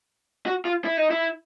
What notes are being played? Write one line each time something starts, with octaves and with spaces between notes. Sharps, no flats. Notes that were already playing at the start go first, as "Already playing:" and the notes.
F#4
F4
E4
D#4
E4